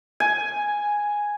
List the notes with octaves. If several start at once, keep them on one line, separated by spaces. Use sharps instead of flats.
G#5